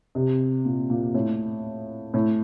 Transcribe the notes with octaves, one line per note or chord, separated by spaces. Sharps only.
C3
A#2
A#2
A2
A2